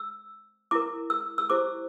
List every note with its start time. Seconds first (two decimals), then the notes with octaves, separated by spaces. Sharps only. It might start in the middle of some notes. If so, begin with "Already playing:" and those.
Already playing: E6
0.71 E4 A#4 D6
1.10 E6
1.38 E6
1.50 E4 G4 C5 D6